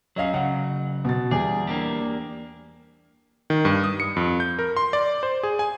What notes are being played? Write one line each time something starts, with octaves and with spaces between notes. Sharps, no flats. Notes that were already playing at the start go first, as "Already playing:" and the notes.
F#3 C#4 C#5 D#5 F5
C#3 F#3 F#5
B2 A6
E2 G3 G#4 D6
A#3 D4 G4
D#3
G2
D#6
C#7
F2
G6
A#4
C6
D5
C5
G#4
G#5